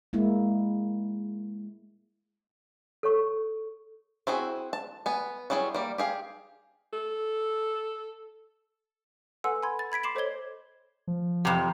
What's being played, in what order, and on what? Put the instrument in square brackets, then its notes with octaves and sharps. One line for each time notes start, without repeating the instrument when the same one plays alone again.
[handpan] G#3 A#3 E4
[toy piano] A4 C#5 C#6
[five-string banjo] C4 E4 F#4 G#4
A5
B3 G#5
F#3 G3 E4 G#4 C#5
G3 A#3
G4 G#4 F5
[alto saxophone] A4
[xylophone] A4 B4 F#5 G#5 C6 E6
G#5 B5 C6 G#6
A6
B5 G#6 B6 D7
C6 D6 C7 E7 F#7
A4 C5 C#5 D#5 G#6 G7
[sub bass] F3
[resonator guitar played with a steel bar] F2 C3